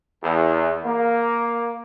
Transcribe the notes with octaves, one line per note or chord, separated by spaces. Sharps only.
E2
A#3